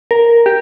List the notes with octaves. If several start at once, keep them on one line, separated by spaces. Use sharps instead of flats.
A#4
G4